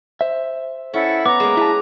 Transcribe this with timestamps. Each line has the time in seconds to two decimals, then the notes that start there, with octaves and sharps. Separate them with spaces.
0.21 C5 E5
0.93 C#4 E4 A4 F#5
1.26 B3 A#5 D6
1.40 G#3 A#3
1.57 E4 B4 A5